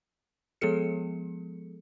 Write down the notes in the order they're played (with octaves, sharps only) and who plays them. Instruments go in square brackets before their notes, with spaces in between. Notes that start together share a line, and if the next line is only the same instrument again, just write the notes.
[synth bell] F3 G#3 B3 G#4 A4 C#7